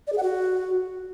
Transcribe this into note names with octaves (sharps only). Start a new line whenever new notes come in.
D5
G#4
F#5
F#4